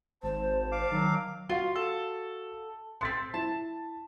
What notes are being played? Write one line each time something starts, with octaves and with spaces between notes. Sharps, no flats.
G#1 C5 A5
F5 D6
D#3 F#3
F4 F#4 F5
A4
B3 C4 C6 A6 B6
E4 A5